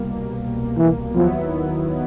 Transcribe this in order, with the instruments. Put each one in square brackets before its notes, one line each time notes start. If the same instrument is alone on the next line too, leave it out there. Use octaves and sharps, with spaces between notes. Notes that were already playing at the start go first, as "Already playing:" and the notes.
Already playing: [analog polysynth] C2 B2 G3 A#3
[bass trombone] E3
[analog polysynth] D#2 D#3 F#3 B3 E4 [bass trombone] F3